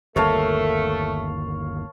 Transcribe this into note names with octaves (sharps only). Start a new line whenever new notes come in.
G1 D#2 A3 A#4 C#5 F5 A5